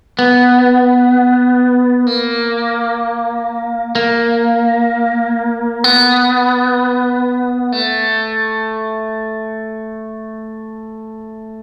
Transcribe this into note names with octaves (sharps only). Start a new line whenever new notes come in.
B3
A#3
A#3
B3
A3